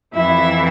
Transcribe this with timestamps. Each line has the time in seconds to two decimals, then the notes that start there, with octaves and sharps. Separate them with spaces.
0.15 F2 E3 E4 E5